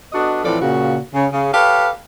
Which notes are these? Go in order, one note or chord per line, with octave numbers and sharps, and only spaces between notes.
B3 D4 F#4 A4 D#5
A2 E3 F3 C4 A4 D5
A#2 C#3 F#4
C#3
C#3
G4 A4 B4 C#5 F5